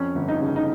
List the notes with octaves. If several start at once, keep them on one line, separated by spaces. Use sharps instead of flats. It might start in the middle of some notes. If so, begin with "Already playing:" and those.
Already playing: F2 C#4
G1
D#4
C#3
D#4